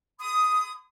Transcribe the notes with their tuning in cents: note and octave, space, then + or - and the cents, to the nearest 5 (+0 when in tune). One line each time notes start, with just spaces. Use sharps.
B5 +45 D#6 +5